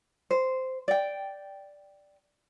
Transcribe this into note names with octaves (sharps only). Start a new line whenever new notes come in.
C5
D5 G5